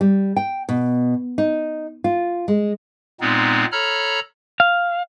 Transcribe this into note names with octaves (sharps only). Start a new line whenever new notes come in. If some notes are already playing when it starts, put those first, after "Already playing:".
G3
G5
B2
D#4
F4
G#3
A#2 G#3 B3 C4 D#4
A4 C#5 A#5 B5 F6
F5